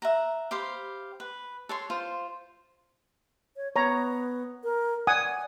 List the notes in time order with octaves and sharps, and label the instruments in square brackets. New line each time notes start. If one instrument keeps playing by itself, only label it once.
[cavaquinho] E5 F#5 A#5
G4 C5 F5 B5
B4
A4 C#5 C6
F4 C5
[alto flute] C#5
[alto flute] B3 [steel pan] C#5 A#5
[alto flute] A#4
[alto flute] D5 [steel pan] F#5 G#5 D#6